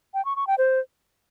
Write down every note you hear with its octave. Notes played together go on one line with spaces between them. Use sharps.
G5
C#6
C#6
G5
C5